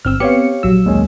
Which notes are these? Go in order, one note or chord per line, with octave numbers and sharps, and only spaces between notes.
G1 C4 E6 F6
B3 C4 G4 C#5 F5 C#7
A#1 F#3 E6
D#2 G#3 C#4